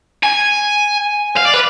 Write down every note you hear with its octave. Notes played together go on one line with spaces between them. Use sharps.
G#5
F5
D5
B4